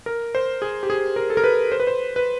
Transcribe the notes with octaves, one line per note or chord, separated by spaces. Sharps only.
A#4
C5
G#4
G4
G#4
A#4
A4
A#4
B4
C5
B4
C5
B4